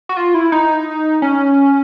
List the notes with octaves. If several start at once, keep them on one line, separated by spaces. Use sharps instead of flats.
F#4
F4
E4
D#4
C#4